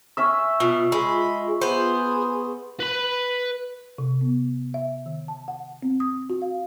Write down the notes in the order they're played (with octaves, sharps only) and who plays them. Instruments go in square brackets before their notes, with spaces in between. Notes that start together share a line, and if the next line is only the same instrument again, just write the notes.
[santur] C#4 E5 E6
[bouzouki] B2 [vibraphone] F4
[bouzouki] G#3 [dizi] B5
[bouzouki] B3 B4 C5 [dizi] G#4
[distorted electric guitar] B4 B5
[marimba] C3
B3
E5
D#3
A5
F#5
C4
D#6
F#4
F5